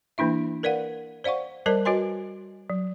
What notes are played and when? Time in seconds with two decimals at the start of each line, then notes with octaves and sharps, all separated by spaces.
0.18 E3 A#3 D4 E4 E5
0.63 A#4 B4 D5 F5 F#5
1.24 C5 D5 F5 F#5 C#6
1.66 G3 A#4 C5 D5 A5
1.85 F#4 B4 C#5 D#5 G#5 C6
2.70 F#3